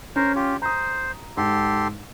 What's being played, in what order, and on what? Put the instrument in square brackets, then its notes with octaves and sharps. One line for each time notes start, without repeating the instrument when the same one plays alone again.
[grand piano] C#4 [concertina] A#4 C5
[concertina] F4 G4
[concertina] C5 [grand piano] A#5 D#6
[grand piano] G#2 [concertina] G4 A4 C6